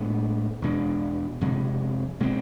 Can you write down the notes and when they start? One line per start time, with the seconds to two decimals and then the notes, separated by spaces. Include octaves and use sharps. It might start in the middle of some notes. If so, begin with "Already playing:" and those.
Already playing: A2 G#3 B3 D4
0.62 E2 B2 G#3 D4
1.41 F2 C3 G#3
2.20 B2 G#3 C4